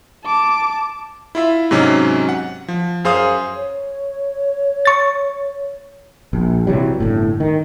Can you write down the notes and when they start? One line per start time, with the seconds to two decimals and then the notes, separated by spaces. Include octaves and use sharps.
0.25 A5 D6
1.35 E4 F4 E5
1.71 G#2 C3 F#3 C#4 D#4
2.29 F#5
2.68 F3
3.04 F#2 G#4 C5 F5 D#6
3.55 C#5
4.85 C#6 A6
6.33 A#1
6.67 C3 E3 F#3 G3
7.00 G1 A2
7.40 D#3